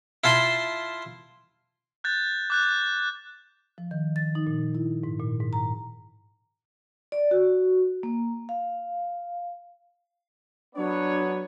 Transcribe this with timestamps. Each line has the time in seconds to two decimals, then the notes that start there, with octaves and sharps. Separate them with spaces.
0.24 E4 F4 A5 C6
2.04 F#6 G6 A6
2.50 D6 F#6 G6
3.78 F3
3.91 D#3
4.16 A6
4.35 D#4
4.47 A#2
4.75 E4
5.04 G#2
5.19 A#2
5.40 G#2
5.53 A#5
7.12 D5
7.31 F#4
8.03 A#3
8.49 F5
10.75 F#3 B3 D4 C#5